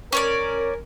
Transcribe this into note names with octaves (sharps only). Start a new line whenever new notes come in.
C#4 A#4 C#5 D5